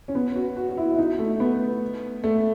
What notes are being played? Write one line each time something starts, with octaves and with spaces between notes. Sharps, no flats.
C#4
B3
F#4
F#4
F#4
E4
E4
D#4
A3
B3
A3